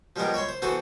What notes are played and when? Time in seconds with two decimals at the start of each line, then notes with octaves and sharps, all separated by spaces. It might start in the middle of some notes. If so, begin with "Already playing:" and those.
0.16 F3 G3 G#3 B3 G4 A#4
0.34 C#5 E5 B5 C6
0.49 C5
0.62 E3 B3 F#4 A4 B4 C5